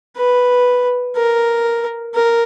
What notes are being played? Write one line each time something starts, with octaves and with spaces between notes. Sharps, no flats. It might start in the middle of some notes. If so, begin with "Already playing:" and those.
B4
A#4
A#4